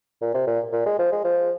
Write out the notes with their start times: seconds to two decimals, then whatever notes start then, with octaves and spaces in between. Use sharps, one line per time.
0.21 A#2
0.34 C3
0.47 A#2
0.72 A#2
0.86 G#3
0.99 F3
1.12 G#3
1.24 F3